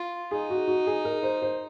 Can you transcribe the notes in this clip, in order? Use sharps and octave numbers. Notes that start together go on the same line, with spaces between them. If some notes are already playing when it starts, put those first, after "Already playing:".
Already playing: F4
D#4 G#4
F#4
F#4
G#4
A#4
C5
C5